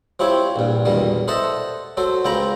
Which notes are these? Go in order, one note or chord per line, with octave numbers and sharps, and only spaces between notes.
F3 C4 E4 G4 C#5
A#1 G2
B1 E2 D#3 G3
A4 C5 D#5 E5 F#5 A5
F#3 A4 C5
C#2 F3 C4 G5 A#5 B5